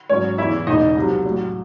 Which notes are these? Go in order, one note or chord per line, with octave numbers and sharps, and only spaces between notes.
G#1 G#2 F#3 C#4 C#5
E2 C#3 E3 E4 E5
E1 E2 C#3 E3 D#4 D#5
C2 C3 F#3
A1 A2 F#3